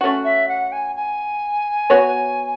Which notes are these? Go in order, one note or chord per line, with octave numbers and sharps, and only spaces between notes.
A3 C#4 F#4
E5
F#5
G#5
G#5
B3 F#4 C#5